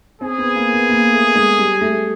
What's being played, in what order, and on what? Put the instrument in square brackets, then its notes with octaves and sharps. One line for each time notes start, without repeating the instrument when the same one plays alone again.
[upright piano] C4 [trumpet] G#4
[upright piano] B3
A#3
B3
A#3
A3
G#3
G3
A3